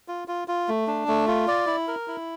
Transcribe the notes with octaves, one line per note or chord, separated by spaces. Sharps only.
F4
F4
F4
A3
D4
A3
F4
D5
E4
A#4
E4